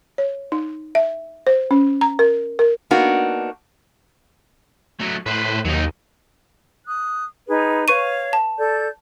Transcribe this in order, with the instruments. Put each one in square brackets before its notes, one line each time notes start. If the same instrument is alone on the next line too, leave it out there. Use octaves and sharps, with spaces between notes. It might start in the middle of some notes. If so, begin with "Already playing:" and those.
[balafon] C#5
D#4
E5
C5
C#4
A#5
A#4
A#4
[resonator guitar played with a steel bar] A#3 B3 D4 D#4 F#4
[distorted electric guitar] F#3 A3
[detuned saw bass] A2 [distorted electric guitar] B4 C5
[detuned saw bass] D#2 [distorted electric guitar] F#3 D#4
[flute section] D#6 F#6
D#4 G#4 B4
[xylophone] B4 C#6 D#7 [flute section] C#5 F5
[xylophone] A5
[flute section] A4 D5 G6